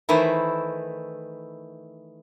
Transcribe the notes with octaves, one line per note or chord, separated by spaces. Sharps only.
D#3 E3 A3 E4 C5